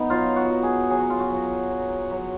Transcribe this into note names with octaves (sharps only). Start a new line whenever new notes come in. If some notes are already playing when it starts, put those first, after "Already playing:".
Already playing: B3 D#4
F#3 F4
F#4
F#3
G#4
F#3 G#4
F#4
F4
F#4
F#3
F#3
F#3